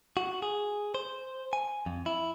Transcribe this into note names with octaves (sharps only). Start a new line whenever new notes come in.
F#4
G#4
C5
G#5
F2
E4